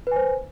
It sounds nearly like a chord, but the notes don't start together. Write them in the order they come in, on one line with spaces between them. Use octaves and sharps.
B4 G#5 C5